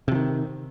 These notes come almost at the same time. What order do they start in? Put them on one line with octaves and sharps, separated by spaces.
C3 F3 D#3